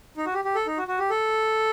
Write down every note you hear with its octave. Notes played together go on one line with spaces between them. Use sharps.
D#4
F#4
G4
G4
A4
D#4
F#4
F#4
G4
A4